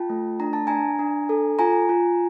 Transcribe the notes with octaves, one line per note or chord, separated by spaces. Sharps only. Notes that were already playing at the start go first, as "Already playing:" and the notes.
Already playing: F4 G5 A5
A3
D4 A#5
A5
D4 G#5 A#5
D4
A4
F4 G#5 A#5
F4